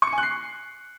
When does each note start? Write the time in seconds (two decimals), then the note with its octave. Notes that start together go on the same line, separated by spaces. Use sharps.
0.02 C#6
0.07 C#7
0.12 G#5
0.18 F#6
0.23 C7